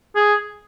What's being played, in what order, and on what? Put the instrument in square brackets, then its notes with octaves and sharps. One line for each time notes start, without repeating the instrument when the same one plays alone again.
[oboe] G#4